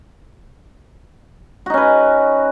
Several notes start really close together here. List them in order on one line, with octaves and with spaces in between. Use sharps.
F#4 D#4 C#4 B4